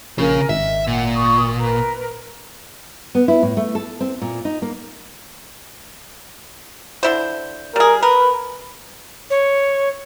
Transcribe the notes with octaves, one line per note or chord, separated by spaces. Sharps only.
A#1 C#3 C#4 A#4 F5 G#5
G#1 D#5 E5
A#2 F#5
F4 C#6 D#6
A#4 B4 A#5
B3
E4
A2
A3
A4
C4
A#2
D#4
A#3
D3 E4 C5
G3 G#4 A#4
A#4 B4
C#5